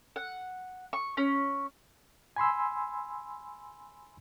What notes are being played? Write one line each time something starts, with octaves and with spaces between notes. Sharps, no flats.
F#5
C#6
C#4
G#5 B5 C6 E6